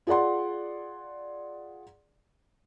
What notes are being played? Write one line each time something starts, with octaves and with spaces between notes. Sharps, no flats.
F4 G#4 D5 F#5 C6